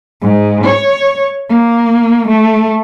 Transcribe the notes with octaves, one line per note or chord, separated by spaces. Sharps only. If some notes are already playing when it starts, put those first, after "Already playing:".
G#2
C#5
A#3
A3